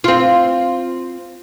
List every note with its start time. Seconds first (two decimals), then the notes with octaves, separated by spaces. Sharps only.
0.04 C4 F4